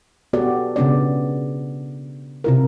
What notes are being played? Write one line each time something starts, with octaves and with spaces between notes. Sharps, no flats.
B3 F#4 G4 A4 D5
C#3 B3 D4 D5
C3 E4 A#4